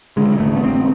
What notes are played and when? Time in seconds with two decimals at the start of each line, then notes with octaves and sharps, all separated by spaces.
0.17 D3 G#3
0.40 A1 A3
0.57 B3
0.64 A1 C4